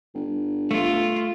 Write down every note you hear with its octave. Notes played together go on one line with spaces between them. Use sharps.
G1
A3 F4